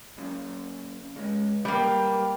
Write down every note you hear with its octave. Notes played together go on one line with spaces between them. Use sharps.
F#2 C#3
C#3 G#3
G3 A#3 B4 G5